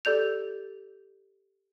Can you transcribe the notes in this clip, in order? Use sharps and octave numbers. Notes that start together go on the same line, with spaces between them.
G4 A4 D5 G6 F7